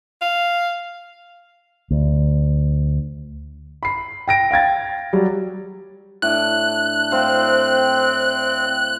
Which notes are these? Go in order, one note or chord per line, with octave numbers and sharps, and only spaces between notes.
F5
D2
B5 C7
G5 A#6 D7
F5 G5 G#6 A6
F#3 G3
A2 D4 F#6
A2 C4 C5 F5